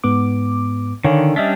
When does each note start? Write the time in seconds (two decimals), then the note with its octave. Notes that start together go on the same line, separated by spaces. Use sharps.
0.04 G#2 B3 D6
1.04 D3 D#3 C#5 F5 G#5
1.36 G3 C#4 D4 D#5 E5 B6